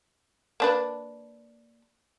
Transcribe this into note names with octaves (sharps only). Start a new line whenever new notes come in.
A#3 D4 B4